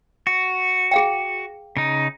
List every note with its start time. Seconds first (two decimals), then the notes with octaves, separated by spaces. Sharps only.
0.27 F#4
0.91 G#4 F5 G5
1.77 C#3 D#4